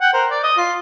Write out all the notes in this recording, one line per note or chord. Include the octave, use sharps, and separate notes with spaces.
F#5 G5
A#4 C5
D5
D#5
F4